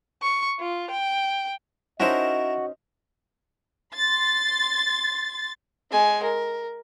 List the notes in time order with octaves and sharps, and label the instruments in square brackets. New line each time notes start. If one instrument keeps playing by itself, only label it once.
[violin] C#6
F4
G5
[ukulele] C#4 D#4 C5 [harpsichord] E4 A#4 A5 [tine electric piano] F#4 [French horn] D#5
[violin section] C6 A6
[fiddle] G#3 G#5
A#4